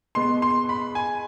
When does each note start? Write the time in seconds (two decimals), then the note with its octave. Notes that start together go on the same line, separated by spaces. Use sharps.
0.15 B2 G#3 B3 C6
0.42 C6
0.69 B5
0.95 G#5